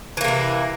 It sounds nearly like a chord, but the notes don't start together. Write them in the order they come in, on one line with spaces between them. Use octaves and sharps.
E3 A#3 C3 E4